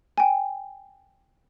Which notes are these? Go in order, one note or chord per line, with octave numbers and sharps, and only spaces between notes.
G5 G#5